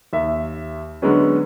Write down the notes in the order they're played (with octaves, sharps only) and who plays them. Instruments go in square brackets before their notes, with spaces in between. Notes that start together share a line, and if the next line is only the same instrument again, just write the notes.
[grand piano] D#2 E5
D3 F#3 G#3 B3 C#4